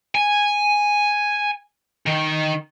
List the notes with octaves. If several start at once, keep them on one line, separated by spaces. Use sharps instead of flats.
G#5
D#3